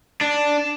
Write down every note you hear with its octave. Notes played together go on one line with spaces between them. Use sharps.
D4